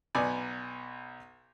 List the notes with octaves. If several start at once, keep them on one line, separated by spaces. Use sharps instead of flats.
B1 B3 D5 G#5